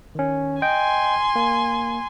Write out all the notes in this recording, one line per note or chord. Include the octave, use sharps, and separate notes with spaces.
D#3 C#4
D#5 G5 G#5 C6
A#3